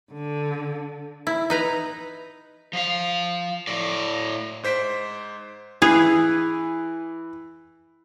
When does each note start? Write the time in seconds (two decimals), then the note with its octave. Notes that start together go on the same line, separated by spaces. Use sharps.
0.11 D3
1.27 E4
1.50 D#4 B4 A#5
2.73 F3 F5
3.67 A2 D5
4.63 G#2 C5 B6 D7
5.82 E3 G#4 F5